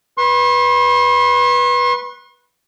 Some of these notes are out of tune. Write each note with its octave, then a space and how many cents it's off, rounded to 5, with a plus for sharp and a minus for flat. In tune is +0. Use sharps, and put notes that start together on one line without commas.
B4 -10 C6 +45